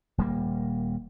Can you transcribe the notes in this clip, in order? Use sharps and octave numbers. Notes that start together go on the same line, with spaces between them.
D#1 G3 A#3